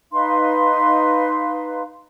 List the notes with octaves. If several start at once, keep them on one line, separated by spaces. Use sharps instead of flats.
D#4 B4 F5 C6